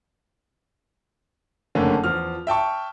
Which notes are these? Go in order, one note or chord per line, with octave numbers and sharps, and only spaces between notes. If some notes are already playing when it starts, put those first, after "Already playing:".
F#1 F2 D3 A3 A#3 C#4
E2 F3 F6
E5 G5 A5 C#6